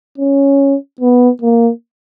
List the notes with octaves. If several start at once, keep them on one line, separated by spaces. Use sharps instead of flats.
C#4
B3
A#3